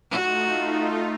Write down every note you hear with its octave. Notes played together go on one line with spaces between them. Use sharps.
A3 D#4 F4 F#4